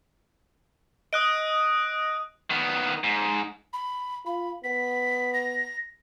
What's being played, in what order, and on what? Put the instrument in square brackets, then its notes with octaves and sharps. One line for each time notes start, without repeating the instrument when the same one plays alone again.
[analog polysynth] D#5 [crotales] D#6 F#6 D7
[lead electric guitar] D#3 B3
G#2
[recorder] B5
[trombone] F4 [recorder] B5
[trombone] B3 [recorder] B6
[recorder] A#6